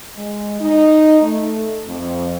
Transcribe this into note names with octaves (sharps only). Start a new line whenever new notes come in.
G#3
D#4
A3
F2